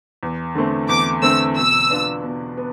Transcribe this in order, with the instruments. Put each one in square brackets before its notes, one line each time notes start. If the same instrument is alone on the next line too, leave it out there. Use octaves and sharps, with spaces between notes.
[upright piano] E2
D3 A3 C4
[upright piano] E2 [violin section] D6
[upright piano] D3 A3 C4 [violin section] E6
[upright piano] B2 [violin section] E6
[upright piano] B3 D4 F4
B2
B3